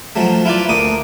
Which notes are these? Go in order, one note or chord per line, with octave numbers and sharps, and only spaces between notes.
F3 F#3 A3
E4 F4 B4 D5
D2 A#3 D6 D#6